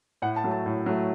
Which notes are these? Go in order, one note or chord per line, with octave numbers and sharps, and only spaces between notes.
A2 F#5
A5
F#3 A3
A5
A2
F#3 A3